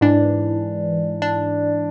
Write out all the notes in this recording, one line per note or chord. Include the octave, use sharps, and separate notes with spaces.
G#2 E3 D4
D4